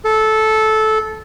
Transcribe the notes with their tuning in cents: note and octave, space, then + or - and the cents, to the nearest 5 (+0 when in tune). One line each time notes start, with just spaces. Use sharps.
A4 -15